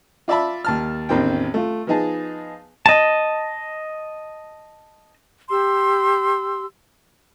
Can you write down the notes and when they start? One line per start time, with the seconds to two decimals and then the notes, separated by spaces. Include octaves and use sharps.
0.28 F4 D5 E5 A5 B5
0.65 D#2 A5 F6
1.09 A1 E2 D#3 C4 G5
1.54 A3 F4
1.87 F3 B3 D#4 G#4 A5
2.86 D#5 A5
5.50 G4 C6 E6